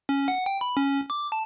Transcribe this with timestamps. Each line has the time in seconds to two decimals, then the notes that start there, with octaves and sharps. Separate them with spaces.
0.09 C#4
0.28 F#5
0.46 G5
0.61 B5
0.77 C#4
1.10 D6
1.32 A5